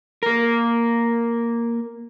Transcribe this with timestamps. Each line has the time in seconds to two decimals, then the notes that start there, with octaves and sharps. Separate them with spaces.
0.23 A#3 A#4